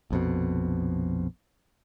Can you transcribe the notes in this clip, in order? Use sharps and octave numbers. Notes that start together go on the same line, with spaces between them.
A#1 F2 B2